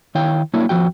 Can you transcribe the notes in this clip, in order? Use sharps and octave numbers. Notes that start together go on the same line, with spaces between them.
D#3 E4 C#5 F5 G5
F#3 A#3 D4 E4 C#5
F2 E3 F3 F#4 G5